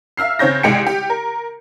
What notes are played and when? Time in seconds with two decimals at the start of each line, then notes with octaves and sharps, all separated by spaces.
0.17 E5 F5 E6 F6 C7
0.39 C#3 C4 C#5 G6 A#6
0.63 C2 G#3 G5 C#7
0.86 G4
1.10 A#4